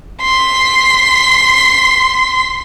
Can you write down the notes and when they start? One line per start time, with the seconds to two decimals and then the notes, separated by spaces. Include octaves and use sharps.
0.22 C6 B6